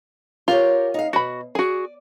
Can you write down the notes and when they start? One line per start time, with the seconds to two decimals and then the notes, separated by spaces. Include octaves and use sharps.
0.48 F4 G4 A#4 C#5
0.94 D#4 F5
1.13 B2 F#4 B5
1.55 F#4 G#4 D5